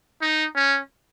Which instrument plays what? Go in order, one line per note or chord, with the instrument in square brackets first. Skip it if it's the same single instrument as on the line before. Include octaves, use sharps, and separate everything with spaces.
[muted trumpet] D#4
C#4